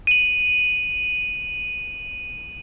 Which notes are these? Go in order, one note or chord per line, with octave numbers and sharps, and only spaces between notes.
D#7 F#7